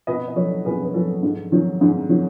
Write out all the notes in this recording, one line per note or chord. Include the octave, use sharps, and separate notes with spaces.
B2 B4 D#5
D#5
F#3 A4 C#5
B2 G#4 B4
B4
F#3 F#4 A4
G#2
D#3 F#3
G#2
D#3 F#3